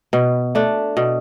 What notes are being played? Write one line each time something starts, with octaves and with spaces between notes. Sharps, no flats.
B2
A3 D4
B2